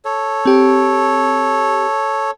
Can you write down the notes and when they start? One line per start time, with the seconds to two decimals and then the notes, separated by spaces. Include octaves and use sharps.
0.05 A4 C#5
0.46 C4 G4